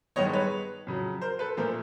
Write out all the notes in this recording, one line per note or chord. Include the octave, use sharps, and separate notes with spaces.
G2 D#3 G#3 B3 C#5 D#5
B4 C#5
F2 C#3 F#3
A#4 C5
A4 B4
A#2 F3 A3 A#4 C5